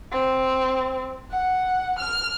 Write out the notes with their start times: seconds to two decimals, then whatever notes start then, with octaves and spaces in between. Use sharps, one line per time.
0.12 C4
1.31 F#5
1.99 F6